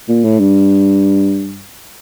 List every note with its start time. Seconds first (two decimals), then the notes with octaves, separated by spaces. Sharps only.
0.08 A#2
0.24 A2
0.39 G2